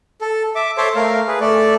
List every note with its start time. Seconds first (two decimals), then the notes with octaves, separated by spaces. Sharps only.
0.21 A4
0.55 E5 D6
0.77 A4 C5 C#5 E5 C6 D6
0.96 A3 A#4 F5
1.28 G#4 B4
1.41 A3 A4 D5